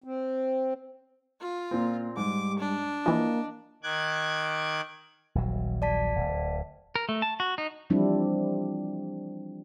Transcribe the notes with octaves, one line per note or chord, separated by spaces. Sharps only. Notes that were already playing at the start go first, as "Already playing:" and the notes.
C4
F4
A#2 A#3 C4
G#2 G3 D6
D4
E3 F3 A#3 D#5
D#3 D6 F#6 G#6
D#1 A#1 F#3
D5 A5 B6
D1
A#4
A3
A5
F#4
D#4
E3 F3 G3 C4 D4 E4